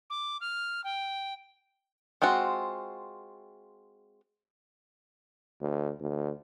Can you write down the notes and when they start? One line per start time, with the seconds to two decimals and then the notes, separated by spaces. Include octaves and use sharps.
0.10 D6
0.41 F6
0.84 G5
2.22 G#3 C4 F4 F#4
5.61 D2
6.00 D2